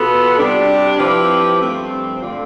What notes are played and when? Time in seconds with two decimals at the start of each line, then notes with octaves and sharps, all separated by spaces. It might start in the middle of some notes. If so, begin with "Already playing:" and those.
Already playing: B2 B3 F4 A4
0.38 C3 G3 D4
0.99 F3 C4 E4 G4 B4
1.59 G2 F3 A3 C4
2.21 D3 A3 D4 F4